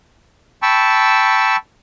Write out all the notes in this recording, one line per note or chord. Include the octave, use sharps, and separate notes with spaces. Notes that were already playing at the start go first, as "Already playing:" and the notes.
G5 A5 B5 C#6 E6